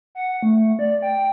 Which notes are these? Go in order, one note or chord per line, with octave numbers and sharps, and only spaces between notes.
F#5
A3
D5
G5